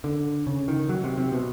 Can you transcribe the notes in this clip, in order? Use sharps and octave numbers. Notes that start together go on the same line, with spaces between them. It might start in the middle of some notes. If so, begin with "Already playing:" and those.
D3
C#3
D#3
F#3
C3
C3
B2